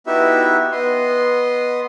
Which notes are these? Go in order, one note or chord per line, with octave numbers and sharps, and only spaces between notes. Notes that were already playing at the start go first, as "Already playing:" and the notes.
B3 D#4 E4 F#4 G4 E5
B3 D#5 C6